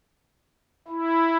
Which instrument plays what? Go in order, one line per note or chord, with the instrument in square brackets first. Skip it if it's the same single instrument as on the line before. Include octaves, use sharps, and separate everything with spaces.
[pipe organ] E4